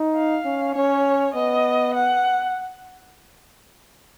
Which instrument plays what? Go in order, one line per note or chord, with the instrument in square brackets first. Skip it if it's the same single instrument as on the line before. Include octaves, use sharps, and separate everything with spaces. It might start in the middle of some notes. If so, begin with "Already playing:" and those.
Already playing: [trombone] D#4
[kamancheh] F5
[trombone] C#4
[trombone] C#4 [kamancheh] C#5
[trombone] B3 [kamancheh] D#5
[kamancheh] F#5